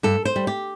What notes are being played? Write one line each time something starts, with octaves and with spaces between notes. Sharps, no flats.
G2 A4
C5
G3
G4